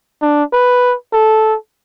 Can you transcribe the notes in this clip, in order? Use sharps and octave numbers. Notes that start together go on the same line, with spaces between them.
D4
B4
A4